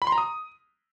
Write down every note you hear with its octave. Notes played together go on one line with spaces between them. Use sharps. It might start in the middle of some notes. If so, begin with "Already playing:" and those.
B5
C6
A#5
D#6